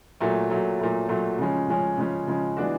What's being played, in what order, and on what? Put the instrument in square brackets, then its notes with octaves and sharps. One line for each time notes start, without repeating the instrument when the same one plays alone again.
[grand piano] A#2 F#3 A3
A#2 F#3 A3
A#2 F#3 A3
A#2 F#3 A3
C#3 F3 G#3 C#4
C#3 F3 G#3 C#4
C#3 F3 G#3 C#4
C#3 F3 G#3 C#4
E3 G#3 B3 D4 F#4